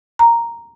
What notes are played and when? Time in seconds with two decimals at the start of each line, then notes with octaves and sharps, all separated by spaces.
0.19 A#5